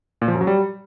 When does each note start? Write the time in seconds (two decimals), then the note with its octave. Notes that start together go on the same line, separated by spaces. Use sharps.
0.22 A#2
0.28 F3
0.34 F#2
0.41 F#3
0.47 G3